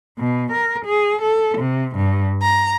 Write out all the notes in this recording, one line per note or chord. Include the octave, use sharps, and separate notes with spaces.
B2
A#4
G#4
A4
C3
G2
A#5